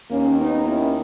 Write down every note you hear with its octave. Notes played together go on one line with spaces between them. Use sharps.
D#2 D#3 A#3 C#4
B3 D#4
C#4 E4